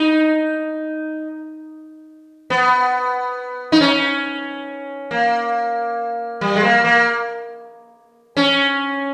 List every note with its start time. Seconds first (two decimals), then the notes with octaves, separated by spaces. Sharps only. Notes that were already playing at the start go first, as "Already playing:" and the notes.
Already playing: D#4
2.50 B3
3.72 D#4
3.81 C#4
5.11 A#3
6.41 G3
6.56 G#3
6.63 A#3
6.85 A#3
8.37 C#4